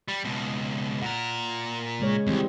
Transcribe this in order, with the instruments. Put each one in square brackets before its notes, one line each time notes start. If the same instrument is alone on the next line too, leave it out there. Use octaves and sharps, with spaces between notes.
[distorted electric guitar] G3
C#2 B2
[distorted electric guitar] A#2 A#4 [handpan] F#5
[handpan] C#3 G#3 C#5
[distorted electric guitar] C#2 [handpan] E3 G3 C4